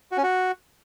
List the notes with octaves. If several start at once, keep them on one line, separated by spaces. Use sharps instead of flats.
F#4
C#4
F#4